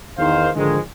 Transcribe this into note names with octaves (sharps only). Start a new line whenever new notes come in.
E2 D#3 C5 F5
G#2 D3 D#3 F3 G#3